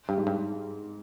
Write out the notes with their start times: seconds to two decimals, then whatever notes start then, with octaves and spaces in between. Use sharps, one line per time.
0.09 G2
0.18 G#2
0.27 G2